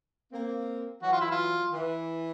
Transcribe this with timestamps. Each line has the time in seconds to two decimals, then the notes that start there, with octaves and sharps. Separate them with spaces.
0.32 A#3 C4
1.02 E3 F#3 F#4
1.13 F4
1.21 E4
1.31 F4
1.73 E3